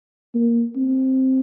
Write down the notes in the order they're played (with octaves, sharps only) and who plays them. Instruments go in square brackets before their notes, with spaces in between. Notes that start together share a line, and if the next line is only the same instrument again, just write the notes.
[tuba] A#3
C4